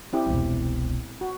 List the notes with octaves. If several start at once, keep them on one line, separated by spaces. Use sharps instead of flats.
C4 E4 G4
E1 C2
F#4